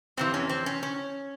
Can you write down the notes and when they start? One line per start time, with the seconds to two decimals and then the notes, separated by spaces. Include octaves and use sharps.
0.17 F2 C3 E3 C4
0.34 C#4
0.49 C4
0.66 C#4
0.83 C#4